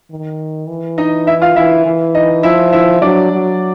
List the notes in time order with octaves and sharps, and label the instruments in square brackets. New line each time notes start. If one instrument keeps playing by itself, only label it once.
[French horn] D#3
E3
[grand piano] D#4 D#5
E4 E5
F4 F5
[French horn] E3 [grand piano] E4 E5
[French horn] E3
[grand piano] D#4 D#5
[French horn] F3 [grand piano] E4 E5
[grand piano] E4 E5
[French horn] F#3 [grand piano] D4 D5
[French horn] F#3